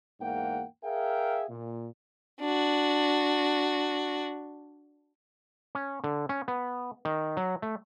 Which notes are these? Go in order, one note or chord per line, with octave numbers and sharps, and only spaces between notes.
E2 G#2 A#3 F#5 G5
G#4 A#4 E5 F5 G5
A#2
D4 F#4
C#4
D3
C#4
B3
D#3
F#3
A3